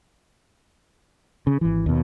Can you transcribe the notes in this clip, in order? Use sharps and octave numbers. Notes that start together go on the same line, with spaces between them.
C#3
G#1 E3
D#2 B2